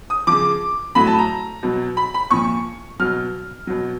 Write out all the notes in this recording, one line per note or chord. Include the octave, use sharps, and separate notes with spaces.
D#6
C#3 F3 D6
A2 F#3 B5
A5
A#5
B2 F#3
B5
B5
A#2 F3 C#6
B2 F#3 F6
B2 F#3